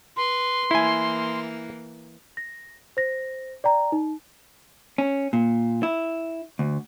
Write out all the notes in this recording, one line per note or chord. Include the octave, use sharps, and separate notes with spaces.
B4 C6
E3 A#3 E4 G#5
A#6
C5 A#6
D5 G5 A#5
D#4
C#4
A#2
E4
D2